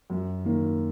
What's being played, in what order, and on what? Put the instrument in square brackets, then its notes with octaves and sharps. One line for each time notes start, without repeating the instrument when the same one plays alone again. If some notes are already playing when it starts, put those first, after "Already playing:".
[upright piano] F#2
D#3 A#3